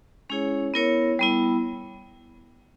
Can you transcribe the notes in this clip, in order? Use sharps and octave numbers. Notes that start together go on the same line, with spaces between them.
G#3 C#4 E4 G#4 C#5
B3 E4 A#4 C#5
G3 B3 E4